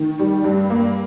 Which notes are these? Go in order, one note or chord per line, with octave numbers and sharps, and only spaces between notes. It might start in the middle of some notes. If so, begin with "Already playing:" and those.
Already playing: D#3
G3
G2
A#3